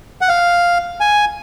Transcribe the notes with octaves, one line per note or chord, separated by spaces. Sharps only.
F#5
F5
G#5